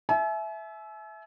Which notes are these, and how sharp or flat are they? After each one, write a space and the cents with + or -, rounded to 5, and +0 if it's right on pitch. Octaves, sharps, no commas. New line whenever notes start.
E5 +0 G#5 +45